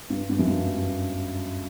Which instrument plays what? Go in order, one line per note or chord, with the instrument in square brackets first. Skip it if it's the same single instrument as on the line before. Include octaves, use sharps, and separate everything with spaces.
[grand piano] G2
G2
F#2
G2